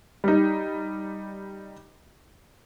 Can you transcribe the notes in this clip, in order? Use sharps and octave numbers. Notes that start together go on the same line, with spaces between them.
G3 D#4